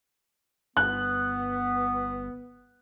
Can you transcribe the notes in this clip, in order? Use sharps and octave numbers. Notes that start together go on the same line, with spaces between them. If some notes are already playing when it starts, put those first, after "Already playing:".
G1 B3 F#6